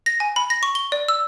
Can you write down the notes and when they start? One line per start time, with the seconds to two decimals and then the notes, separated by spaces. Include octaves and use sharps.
0.06 A#6
0.20 G#5
0.36 B5
0.50 A#6
0.63 C#6
0.75 G7
0.92 D5
1.08 E6